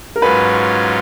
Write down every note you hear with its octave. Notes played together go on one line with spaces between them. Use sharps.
A#4
G#2 F#3 C#4 F4 B4